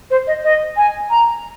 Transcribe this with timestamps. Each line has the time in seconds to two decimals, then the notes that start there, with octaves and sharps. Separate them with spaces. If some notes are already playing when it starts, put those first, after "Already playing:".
0.10 C5
0.27 D#5
0.43 D#5
0.76 G#5
1.09 A#5